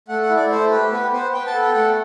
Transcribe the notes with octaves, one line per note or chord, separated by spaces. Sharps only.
A3 F#5
F#5
E4
D5
A3 C5
G4 B4
B3 B4
B3 C5
B3 G5
A5
A4
G5
A3 F#5